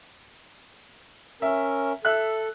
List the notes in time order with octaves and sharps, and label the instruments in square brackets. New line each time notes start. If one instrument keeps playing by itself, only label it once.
[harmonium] C#4 A#4 [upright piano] E5
[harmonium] A4 [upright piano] E5 F#6